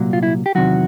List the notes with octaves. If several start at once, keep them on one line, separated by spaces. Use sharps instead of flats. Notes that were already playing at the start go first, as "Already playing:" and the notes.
Already playing: C2 A#2 F#3
F4
E4
G4
E2 C3 D#3 F#3 F#4